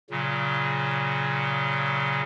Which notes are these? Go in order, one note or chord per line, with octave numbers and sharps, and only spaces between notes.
A#2 C#3 F#3